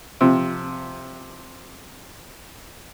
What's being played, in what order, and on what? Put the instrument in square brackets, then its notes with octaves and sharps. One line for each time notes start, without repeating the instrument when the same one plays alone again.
[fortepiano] C3 F3